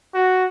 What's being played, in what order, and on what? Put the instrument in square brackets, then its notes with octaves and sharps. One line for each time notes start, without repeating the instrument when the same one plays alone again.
[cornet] F#4